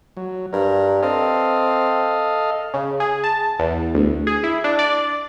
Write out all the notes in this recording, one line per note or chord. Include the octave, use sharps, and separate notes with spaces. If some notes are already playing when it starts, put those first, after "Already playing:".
F#3
G2 A#4
C4 A4 D#5 F5
C#3
G#4
A5
E2
D2
G#4
E4
D4
D5